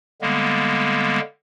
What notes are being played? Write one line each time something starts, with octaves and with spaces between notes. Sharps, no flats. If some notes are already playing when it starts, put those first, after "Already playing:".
D3 G3 G#3 A#3 B3